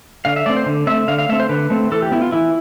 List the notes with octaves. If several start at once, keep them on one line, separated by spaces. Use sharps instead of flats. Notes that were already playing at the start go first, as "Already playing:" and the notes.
D3 F5
E5
A3 C4 D5
C5
D3
A3 C4 E5
D3 F5
F5
A3 C4 E5
C5
D3 B4
A3 C4
E3 A4
G4
B3 E4
F4
E3 E4